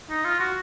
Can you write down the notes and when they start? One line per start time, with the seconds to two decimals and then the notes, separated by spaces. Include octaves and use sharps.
0.10 D#4
0.25 F4
0.40 F#4